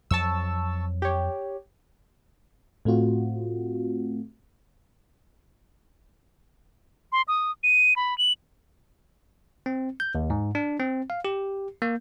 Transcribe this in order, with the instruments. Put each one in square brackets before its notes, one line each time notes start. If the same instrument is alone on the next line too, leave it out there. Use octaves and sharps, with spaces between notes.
[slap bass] F2 F#3 [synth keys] A5 C#6 E6
[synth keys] G4 C#5
[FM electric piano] A2 A3 C4 F4 F#4
[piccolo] C6
D#6
D#7
B5
F#7
[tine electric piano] C4
G6
D#2
G#2
D4
C4
F5
G4
A#3